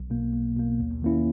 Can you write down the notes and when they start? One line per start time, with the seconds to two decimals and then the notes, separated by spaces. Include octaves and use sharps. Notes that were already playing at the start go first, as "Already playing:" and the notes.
Already playing: B1
0.10 B2 A#3
0.33 B1
0.57 B2 A#3
0.80 D#2
1.02 D#3 A#3 C#4 E4